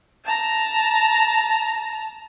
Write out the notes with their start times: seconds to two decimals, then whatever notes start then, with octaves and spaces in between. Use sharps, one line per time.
0.25 A5 A#5